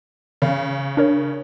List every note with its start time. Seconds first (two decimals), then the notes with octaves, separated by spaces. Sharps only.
0.42 C#3
0.97 D4 A#4 C#5